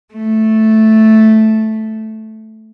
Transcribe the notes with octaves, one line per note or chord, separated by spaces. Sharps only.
A3